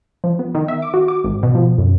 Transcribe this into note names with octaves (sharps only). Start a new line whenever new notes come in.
F3
B3
D#3
E5
D6
F#4
D6
G#1
B2
F3
F#2